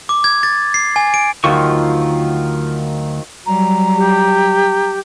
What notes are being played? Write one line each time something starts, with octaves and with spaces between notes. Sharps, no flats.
D6
G#6
A6
C7
G#5
D7
D2 D#3 F3 F#3 F4 C#6
F#3 G3 A#5
G4